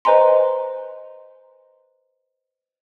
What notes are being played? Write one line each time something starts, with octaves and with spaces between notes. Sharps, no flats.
B4 C5 D#5 G#5 A#5 C6